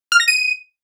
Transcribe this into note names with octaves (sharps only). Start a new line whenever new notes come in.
F6
A#6
D#7